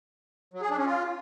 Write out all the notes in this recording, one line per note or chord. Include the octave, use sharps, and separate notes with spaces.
F#3
G#4
D4
C#4
F4